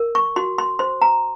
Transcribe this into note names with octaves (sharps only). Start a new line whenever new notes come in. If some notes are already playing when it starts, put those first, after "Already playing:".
Already playing: A#4
C#6
F#4 C6
C6
C5 C6
A#5